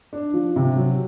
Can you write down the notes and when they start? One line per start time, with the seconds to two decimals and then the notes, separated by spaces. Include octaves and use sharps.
0.13 D4
0.34 F3
0.56 C3
0.76 F#3